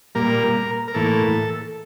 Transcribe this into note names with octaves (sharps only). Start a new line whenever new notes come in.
A#2 G3 A#3 A#4
A#4
A2 E3 A#3 A4